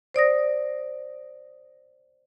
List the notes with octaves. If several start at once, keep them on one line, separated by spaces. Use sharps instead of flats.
C5 D5 D#6 A#6